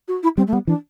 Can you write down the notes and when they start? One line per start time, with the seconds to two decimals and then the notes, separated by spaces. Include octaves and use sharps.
0.08 F#4
0.23 E4
0.37 G3 C4
0.47 A3
0.53 G3 B3
0.67 E3 D4